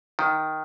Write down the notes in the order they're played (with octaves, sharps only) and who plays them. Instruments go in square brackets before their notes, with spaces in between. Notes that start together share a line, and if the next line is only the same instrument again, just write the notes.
[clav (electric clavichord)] D#3